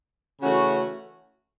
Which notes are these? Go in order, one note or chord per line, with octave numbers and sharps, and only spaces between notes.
C#3 E3 A3 C#4 F#4